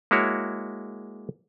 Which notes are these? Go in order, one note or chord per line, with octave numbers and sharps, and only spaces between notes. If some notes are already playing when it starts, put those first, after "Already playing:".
G#3 A#3 E4 F#4 C#5